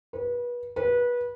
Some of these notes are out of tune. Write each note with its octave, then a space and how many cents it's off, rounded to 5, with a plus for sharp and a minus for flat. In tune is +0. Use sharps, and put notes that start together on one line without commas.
B4 -30
B4 -25